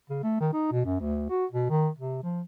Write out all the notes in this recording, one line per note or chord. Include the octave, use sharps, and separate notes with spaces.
C#3
A3
D#3
D#4
B2
F#2
D2
F#4
B2
D#3
C3
F3